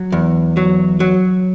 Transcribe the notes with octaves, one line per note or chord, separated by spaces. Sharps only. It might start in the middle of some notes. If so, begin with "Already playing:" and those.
Already playing: F#3
E2
F#3
F#3